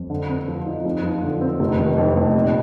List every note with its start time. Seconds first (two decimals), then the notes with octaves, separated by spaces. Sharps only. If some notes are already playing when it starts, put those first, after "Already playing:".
Already playing: F2
0.10 D3
0.29 C4
0.48 F3
0.66 D#4
0.85 F2
1.03 F3
1.23 D3
1.41 C4
1.60 F1
1.79 D#3
1.98 F2
2.16 F1
2.35 A#2